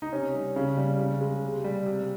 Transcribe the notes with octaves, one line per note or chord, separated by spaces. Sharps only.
D#4
C3 C#4
G3
C#3
G3
C#3
G#3
C3
G3
C3